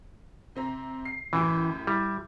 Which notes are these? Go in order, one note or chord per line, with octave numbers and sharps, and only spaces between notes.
C3 C4 A#5
C7
F#2 A2 E3 G4
G3 E4